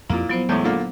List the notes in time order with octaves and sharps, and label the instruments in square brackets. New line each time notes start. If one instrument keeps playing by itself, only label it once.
[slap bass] F2 [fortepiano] A#2 A#3 [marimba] E4
[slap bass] F3 [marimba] F#3 B3 C5
[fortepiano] E2 A2 [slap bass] G#3 [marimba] G6
[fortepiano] A#2 D3 A#3